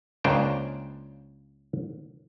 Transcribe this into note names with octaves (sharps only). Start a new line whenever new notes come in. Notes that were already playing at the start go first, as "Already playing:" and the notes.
C#2 C#3 A#3 D4 C5 G5